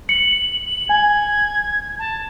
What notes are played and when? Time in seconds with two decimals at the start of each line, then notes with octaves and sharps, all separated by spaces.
0.09 C#7 F#7
0.65 F#7
0.89 G#5 G#6
1.99 A5